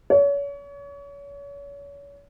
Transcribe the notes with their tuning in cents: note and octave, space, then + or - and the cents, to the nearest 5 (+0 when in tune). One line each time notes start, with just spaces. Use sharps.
C#5 +35